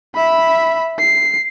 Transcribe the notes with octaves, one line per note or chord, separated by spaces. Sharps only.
E5 B5
C7